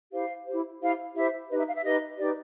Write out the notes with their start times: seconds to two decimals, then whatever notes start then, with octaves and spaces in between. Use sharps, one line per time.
0.12 E4 G4 C5 F5
0.46 E4 G4 C5
0.81 E4 G4 C5 F5
1.15 E4 G4 C5 E5
1.49 D#4 G4 B4 D#5
1.58 E5
1.67 F5
1.75 E5
1.84 D#4 G4 B4 D#5
2.18 D#4 G4 B4 D5